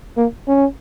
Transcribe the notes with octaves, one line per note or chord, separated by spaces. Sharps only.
A#3
C#4